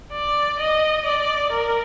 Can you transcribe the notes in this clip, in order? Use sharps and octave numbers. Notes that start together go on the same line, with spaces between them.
D5
D#5
D5
A#4